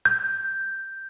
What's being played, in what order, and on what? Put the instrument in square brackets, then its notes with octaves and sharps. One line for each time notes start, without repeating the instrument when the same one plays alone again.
[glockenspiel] G6